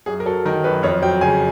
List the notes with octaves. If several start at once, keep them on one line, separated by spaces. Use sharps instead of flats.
F#2 G#4
A#4
F#3 A4
D#3 A#4
F#2 B4
F2 C#5
F#3 G5
C#3 G#5